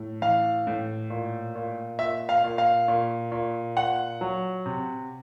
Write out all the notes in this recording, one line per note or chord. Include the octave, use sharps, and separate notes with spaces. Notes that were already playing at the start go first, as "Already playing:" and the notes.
Already playing: A2
E3 F5
A2
A#2
A#2
A#2 E5
F5
A#2
F5
A#2
A#2
A#2 F#5
F#3
C3